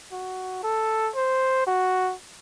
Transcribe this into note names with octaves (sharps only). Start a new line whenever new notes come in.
F#4
A4
C5
F#4